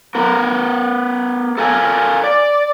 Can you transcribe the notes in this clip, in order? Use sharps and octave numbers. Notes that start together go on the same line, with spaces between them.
B3 A#4
A4 A#4 F5 F#5 G#5
D5